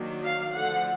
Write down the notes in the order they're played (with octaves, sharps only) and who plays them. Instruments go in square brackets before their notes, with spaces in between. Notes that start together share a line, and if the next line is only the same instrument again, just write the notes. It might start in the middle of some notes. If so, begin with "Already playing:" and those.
Already playing: [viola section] D#3 F#3 A#3 D4
F5
D3 F3 A3 F#5